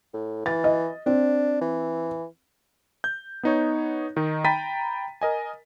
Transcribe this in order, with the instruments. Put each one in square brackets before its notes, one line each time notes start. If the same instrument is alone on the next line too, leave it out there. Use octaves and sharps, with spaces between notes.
[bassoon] A2
[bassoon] E3 [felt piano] A6
[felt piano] D#5
[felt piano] C4 [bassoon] D4
[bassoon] E3
[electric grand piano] G6
B3 D#4 C#5
D#3 D#4
G5 A#5 B5 A6 B6 D#7
A#4 D#5 G#5